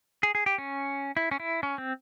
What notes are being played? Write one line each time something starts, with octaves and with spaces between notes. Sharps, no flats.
G#4
G#4
G4
C#4
E4
C#4
E4
C#4
C4